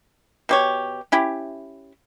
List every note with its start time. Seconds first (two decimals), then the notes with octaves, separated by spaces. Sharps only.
0.49 B2 G4 C#5
1.12 C#4 E4 G4